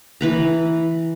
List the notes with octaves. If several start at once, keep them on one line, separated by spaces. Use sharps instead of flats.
E3 B4 A#5